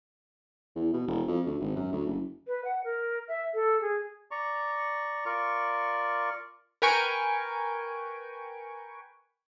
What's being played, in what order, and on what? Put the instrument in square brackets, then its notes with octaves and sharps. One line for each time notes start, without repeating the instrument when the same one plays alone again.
[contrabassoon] E2
B2
E1
F2
D2
G#1
F#2
D2
F#1
[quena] B4
F#5
A#4
E5
A4
G#4
[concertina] D5 A#5 C#6
F4 A#4 D5 C#6
[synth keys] A#4 B4 G5 G#5 C#6 D7